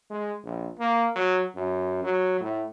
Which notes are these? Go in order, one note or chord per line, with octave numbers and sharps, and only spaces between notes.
G#3
A#1
A#3
F#3
F#2
F#3
A2